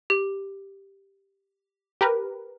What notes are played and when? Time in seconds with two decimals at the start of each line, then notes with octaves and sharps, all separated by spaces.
0.10 G4
2.01 G4 A#4 B4